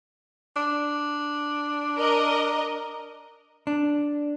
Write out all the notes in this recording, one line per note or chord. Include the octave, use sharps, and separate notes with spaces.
D4
A#4 D#5
D4